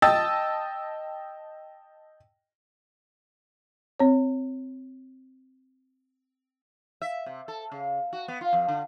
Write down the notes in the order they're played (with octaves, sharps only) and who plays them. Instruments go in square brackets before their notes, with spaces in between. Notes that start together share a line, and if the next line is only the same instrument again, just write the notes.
[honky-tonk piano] D#5 G5 A5 D#6 E6 A6
[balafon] C4 C#5
[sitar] E5
C3
A4
C#3
F#4
B3
F4
F2
D3